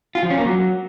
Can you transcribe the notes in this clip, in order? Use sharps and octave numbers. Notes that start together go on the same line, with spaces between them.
F4
F3
C#4
A#3
F#3